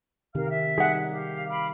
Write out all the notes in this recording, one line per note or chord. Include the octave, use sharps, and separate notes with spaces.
C3 D#3 G4 A#4 F5 F6
E5
G3 D#4 G#4 F#5
G4 F5
F5 B5 D6